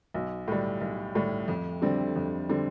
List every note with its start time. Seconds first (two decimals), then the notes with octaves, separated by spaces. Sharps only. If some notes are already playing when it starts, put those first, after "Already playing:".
0.14 B1
0.48 A2 G3
0.81 B1
1.15 A2 G3
1.48 F2
1.82 D3 G3 C4
2.16 F2
2.49 D3 G3 C4